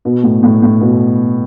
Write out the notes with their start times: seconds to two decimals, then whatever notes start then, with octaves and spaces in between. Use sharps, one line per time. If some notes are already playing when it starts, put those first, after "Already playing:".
0.05 B2
0.23 A2
0.43 A2
0.62 A2
0.81 B2